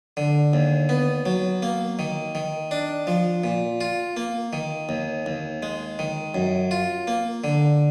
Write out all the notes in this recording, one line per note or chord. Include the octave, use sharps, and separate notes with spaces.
D3
D#2
B3
F#3
A#3
D#3
D#3
D4
F3
A#2
F4
A#3
D#3
D#2
D#2
G#3
D#3
F#2
F4
A#3
D3